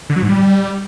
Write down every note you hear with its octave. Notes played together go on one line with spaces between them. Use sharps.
D3
F#3
G#2
G3